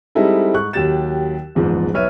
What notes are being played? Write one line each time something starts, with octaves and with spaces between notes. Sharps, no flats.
G3 G#3 C4 D#4 E4 A4
G#2 C#6 F#6
D#2 F#3 G4 G5 A6 E7
F#1 E2 G#2 F3
B1 B4 C#5 E5 F6 D#7